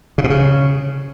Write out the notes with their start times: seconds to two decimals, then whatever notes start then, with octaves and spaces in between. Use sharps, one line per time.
0.18 C#3
0.24 B2
0.30 C#3